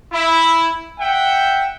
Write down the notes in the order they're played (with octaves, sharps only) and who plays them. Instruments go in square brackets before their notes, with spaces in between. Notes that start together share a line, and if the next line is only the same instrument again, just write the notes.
[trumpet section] E4
E5 F#5 G5